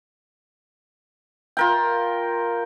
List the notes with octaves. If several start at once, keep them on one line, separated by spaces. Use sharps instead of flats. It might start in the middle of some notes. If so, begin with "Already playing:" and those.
F4 A#4 G5